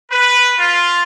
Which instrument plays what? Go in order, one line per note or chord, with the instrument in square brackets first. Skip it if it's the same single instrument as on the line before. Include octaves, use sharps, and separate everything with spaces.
[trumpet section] B4
F4